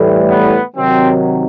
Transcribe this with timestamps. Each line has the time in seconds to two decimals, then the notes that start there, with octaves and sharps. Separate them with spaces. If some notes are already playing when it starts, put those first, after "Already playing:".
Already playing: A2 E3 G3
0.29 B3
0.76 C3 D#3 F#3 C4